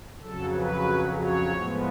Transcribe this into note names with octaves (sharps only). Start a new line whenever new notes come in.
F2 C#3 F#3 A4
B4
C#5
A2 F3 G#3 B3